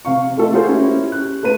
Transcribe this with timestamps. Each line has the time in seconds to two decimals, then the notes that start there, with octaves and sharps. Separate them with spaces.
0.05 C3 F5 C#6
0.37 A3 F4 A4 D#5
0.52 A#3 F4 F#4 G#4 A#4 C5
0.69 C#4 E4 G4
1.12 F#6
1.43 A3 A#3 B4 D#7